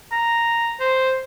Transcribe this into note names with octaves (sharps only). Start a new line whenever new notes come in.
A#5
C5